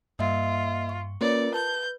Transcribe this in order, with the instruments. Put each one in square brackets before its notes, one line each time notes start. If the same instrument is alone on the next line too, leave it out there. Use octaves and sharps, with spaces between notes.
[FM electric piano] G2 [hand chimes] A#3 D#5 E5 [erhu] F4
[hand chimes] C#6
[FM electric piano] A#3 C#4 [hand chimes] F4 A#4 B4 [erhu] D5
[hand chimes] B4 [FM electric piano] A5 [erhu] G6